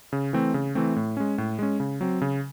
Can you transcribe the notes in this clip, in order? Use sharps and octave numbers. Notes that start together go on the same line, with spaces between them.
C#3
E3 A3 C4
C#3
E3 A3 C4
A2
G#3 C#4
A2
G#3 C#4
C#3
F#3 C4
C#3